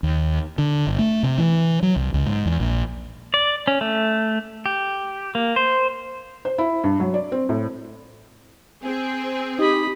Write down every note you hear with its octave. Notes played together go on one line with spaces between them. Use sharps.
D#2
D3
G1
A3
C3
E3
F#3
C2
C#2
G#2
E2
A#1
D5
C#4
A3
G4
A#3
C5
C5
E4
G2
F#3
D5
C4
A2
C4 G#4
D#4 G4 D#5 B5